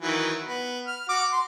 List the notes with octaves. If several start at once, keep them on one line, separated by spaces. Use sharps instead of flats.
D#3 E3 F#3
B3
F6
F#4 D6
C6